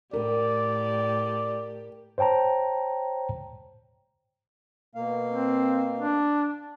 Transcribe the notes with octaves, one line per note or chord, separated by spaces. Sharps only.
A2 G4 A#4 D5
C5 C#5 G5 A5 A#5
B2 A#3 F5
C4
D4